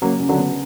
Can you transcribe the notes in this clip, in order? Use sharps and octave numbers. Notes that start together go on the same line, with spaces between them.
C#3 F#3 A#3
C#3
D3 F#3
B3